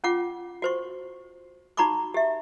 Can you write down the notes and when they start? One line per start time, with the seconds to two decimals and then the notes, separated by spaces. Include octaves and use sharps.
0.04 C#4 F4 F#5 D6
0.62 F#4 C5 C#6
1.77 D#4 F#4 A#5 B5 C#6 D6
2.14 G4 E5